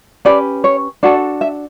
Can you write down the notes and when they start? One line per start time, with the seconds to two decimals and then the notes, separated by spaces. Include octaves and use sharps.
0.25 C#4 G4 B4 D5
0.64 C#5
1.03 D4 F#4 A4 D5
1.41 E5